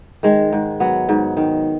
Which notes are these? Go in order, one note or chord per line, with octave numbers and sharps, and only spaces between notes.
D#3 G#3
G#2
F#3 B3
G#2
D#3